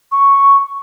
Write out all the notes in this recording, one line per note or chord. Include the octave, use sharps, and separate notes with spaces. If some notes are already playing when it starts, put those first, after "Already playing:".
C#6